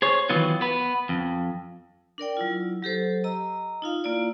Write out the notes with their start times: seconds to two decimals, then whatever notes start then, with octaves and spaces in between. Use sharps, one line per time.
0.02 G#4 C5 C#5
0.29 D#3 E3 F#3 B3 F4
0.61 B3 B4
1.09 F2
2.18 D4 A#4 D5 G5
2.37 F#3 E4 F4
2.83 F#3 G4 A4 C5
3.24 D#5 A#5 E6
3.82 D#4 F4 F5
4.04 A#3 E4 F4 D5